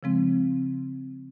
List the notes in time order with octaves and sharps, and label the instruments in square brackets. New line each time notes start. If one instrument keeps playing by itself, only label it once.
[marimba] C#3 F3 G#3 C4